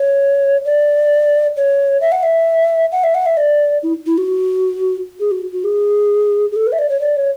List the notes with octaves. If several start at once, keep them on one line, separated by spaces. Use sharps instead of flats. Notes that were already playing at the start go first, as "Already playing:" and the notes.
Already playing: C#5
D5
C#5
E5
F#5
E5
F#5
E5
F#5
E5
D5
E4
E4
F#4
G#4
F#4
F#4
G#4
G#4
A4
B4
E5
D5
C#5
D5
C#5